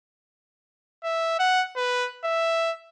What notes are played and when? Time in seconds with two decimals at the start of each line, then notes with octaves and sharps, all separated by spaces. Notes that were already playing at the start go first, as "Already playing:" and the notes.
1.04 E5
1.39 F#5
1.76 B4
2.24 E5